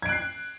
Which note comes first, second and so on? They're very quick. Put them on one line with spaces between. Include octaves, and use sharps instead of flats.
G#6 D7 F#6 C7